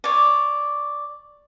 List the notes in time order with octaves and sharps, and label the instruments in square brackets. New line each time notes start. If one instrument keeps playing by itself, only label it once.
[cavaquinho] C#5 D5